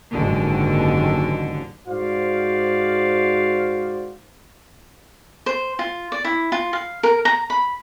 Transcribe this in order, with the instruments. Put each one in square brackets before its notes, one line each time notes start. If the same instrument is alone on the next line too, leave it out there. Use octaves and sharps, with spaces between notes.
[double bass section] F#1 D#2 G#2 [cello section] D3
[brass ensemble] G#2 F#4 C5 D5 F5
[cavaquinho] C5
F4
D5
E4
F4
F5
A#4
A#5
B5